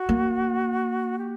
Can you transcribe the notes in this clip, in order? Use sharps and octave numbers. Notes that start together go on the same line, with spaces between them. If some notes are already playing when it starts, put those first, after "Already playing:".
Already playing: F#4
A#3
G4